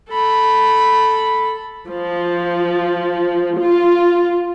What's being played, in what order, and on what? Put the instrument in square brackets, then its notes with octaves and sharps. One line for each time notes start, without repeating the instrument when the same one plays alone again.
[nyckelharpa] A4 B5
[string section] F3
F4